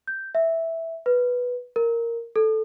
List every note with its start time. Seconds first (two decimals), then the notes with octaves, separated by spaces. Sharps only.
0.07 G6
0.35 E5
1.06 B4
1.76 A#4
2.36 A4